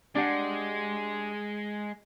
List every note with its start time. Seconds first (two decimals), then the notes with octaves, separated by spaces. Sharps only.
0.15 G#3 D4 G4 F#5